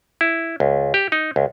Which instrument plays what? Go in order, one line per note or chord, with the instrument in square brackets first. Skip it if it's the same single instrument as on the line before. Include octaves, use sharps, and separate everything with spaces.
[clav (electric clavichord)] E4
C#2
G4
D#4
C#2